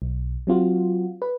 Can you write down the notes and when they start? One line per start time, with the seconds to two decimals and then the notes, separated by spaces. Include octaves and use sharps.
0.02 B1
0.47 F#3 C4 F4 F#4
1.22 B4